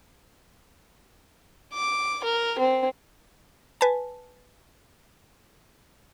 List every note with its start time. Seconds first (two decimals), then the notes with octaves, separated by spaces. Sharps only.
1.74 D6
2.24 A#4
2.59 C4
3.81 B4 G#5 A5